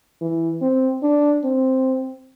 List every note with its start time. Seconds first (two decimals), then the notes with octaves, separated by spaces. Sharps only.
0.21 E3
0.62 C4
1.03 D4
1.44 C4